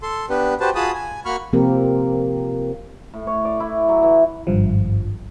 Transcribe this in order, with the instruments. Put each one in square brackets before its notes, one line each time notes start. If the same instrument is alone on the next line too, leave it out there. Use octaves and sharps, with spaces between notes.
[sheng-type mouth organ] A4 C6
B3 D4 G4 B4
F#4 G4 B4 C5 A5
F4 F#4 G#4 A5 B5 D#6
G#5
A#3 F#4 B5 C#6 F6
[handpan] C3 F3 A#3 C4 G4 A#4
[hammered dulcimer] A2
C#5
D5
E4
F#3
E3
[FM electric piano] G#1 G2 F3